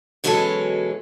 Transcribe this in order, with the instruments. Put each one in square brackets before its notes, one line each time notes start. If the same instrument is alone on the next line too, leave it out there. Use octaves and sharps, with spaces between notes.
[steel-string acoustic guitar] B2 E3 F#3 G#3 C#4 A4